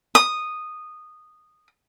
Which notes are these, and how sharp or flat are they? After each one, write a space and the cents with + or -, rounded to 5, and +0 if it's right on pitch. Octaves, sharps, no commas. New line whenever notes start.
D#6 -10